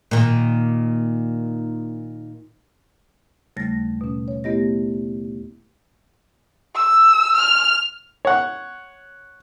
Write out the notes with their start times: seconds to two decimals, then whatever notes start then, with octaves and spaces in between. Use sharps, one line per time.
0.11 A#2 D#3
3.57 D#2 C#3 G3 A3 A6 A#6
4.01 B2 C#4
4.28 C#5
4.44 A3 B3 E4 G4 D#5 A#6
6.76 E6
7.37 F6
8.25 C#5 F#5